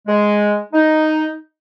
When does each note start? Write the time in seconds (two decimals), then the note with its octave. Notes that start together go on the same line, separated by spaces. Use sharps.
0.08 G#3
0.73 D#4